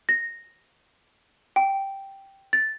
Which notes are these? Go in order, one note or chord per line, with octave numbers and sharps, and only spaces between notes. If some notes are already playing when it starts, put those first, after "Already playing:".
A#6
G5
A6